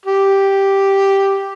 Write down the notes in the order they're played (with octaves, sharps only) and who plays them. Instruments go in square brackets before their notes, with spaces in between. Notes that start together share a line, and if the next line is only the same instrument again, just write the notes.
[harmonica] G4